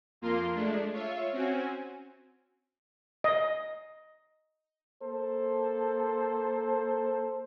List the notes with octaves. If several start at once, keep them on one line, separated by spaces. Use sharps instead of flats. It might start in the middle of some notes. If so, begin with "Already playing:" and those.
F2 A#3 F4 A#4 C6
G#3 A3 D4
F4 C#5 E5
C4 C#4 F#4 G#5
D#5
A#3 A4 C5